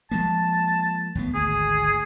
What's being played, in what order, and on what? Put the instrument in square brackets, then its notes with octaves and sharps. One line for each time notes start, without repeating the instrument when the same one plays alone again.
[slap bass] F3 G#3 A#3 [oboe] A5
[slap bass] D#2 A2 B3
[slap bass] G#1 D2 [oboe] G#4